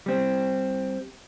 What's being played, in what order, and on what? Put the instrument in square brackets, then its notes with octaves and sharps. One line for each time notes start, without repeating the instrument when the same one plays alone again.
[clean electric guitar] G3 C4